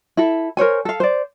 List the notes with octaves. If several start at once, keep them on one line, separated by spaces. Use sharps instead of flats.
E4 A4
A#4 C5 C#5 G#5
A4 F5
C5 D5